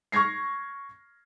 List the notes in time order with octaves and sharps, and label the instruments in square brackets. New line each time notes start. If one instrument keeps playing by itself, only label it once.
[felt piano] C#6 F6 G#6 A#6 C7